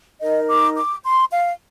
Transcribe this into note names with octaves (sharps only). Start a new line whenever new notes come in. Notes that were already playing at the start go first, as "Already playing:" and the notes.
D#4 A#4 D#5
D6
D6
C6
F5